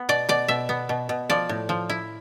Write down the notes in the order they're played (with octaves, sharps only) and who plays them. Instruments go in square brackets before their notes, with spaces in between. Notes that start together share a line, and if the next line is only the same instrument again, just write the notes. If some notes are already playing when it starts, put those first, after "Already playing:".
Already playing: [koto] B3
B2 D5
B2 D5
B2 E5
B3
B2
B2
F3 D5
A2
F3
E4